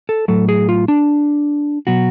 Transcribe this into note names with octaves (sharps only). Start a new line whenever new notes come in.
A4
A2 F#3 A4
G#4
F4
D4
B2 F#3 F#4